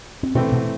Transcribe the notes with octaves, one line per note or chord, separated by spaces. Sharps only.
C4
B2 E3 A3 B3 C4
B2 B3